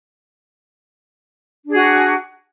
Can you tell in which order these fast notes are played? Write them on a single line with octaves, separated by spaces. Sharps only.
D4 G#4 F#4